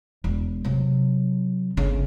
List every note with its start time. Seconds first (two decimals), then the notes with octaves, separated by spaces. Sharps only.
0.24 E1
0.65 C3 F#3
1.77 G1 C#3